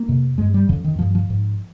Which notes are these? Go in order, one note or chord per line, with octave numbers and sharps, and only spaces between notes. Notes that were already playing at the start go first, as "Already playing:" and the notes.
Already playing: A#3
F2 C3
G2 G#3
G3
F2 C#3 F3
D#3
G2 F3
F3
G#2